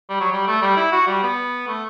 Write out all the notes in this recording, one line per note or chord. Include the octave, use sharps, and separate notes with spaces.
G3
F#3
G3
A3
G3
E4
F#4
G3
B3
A3